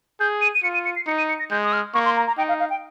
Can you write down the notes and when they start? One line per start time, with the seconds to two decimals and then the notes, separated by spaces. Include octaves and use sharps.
0.20 G#4 G6
0.41 D#7
0.55 D#7
0.63 F4 C#7
0.74 D#7
0.85 C#7
0.96 C7
1.07 D#4 C#7
1.18 D#7
1.29 C#7
1.39 A#6
1.50 G#3 G6
1.64 D#6
1.73 F6
1.94 A#3 C#6
2.05 C6
2.16 A#5
2.27 A#5
2.38 D#4 G5
2.49 F5
2.60 F5
2.70 G5